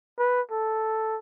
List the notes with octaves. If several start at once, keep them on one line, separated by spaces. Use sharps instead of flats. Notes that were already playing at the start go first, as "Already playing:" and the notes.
B4
A4